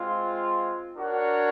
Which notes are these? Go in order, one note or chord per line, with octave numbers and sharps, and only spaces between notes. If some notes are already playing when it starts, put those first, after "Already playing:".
Already playing: G#3 C4 F4
D4 F#4 A#4 C#5